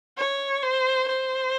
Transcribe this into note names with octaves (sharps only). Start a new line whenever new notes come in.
C#5
C5
C5